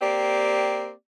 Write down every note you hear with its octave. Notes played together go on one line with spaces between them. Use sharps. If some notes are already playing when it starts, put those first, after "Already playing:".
A#3 C4 G4 D5